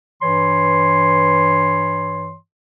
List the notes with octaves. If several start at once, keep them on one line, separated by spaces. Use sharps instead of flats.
G2 E3 C#5 C6